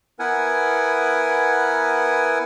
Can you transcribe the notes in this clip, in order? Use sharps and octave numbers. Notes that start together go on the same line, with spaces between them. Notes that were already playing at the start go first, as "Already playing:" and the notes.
B3 E4 A#4 B4 F#5 G#5